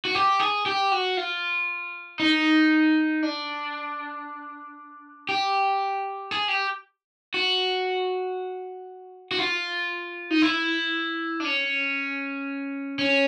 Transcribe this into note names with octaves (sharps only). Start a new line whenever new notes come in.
F#4
G4
G#4
G4
F#4
F4
D#4
D4
G4
G#4
G4
F#4
F#4
F4
D#4
E4
D4
C#4
C#4